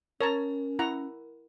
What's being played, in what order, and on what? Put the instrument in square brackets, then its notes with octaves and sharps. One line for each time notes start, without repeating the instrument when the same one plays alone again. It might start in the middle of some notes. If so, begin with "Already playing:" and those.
[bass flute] C#4 [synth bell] A#4 [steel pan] C#5 A5 A#5
[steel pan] E4 F#5 A#5